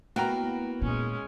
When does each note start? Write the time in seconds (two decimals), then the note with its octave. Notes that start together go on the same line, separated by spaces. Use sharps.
0.16 A#3 B3 E4 F#4 G5 A#5
0.82 A#2 G#3 C#4